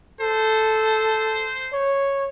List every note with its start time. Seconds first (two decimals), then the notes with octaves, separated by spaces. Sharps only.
0.21 A4 C5
1.73 C#5